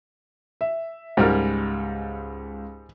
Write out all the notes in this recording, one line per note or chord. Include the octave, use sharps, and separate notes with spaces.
E5
C#2 G#2 G3 A#4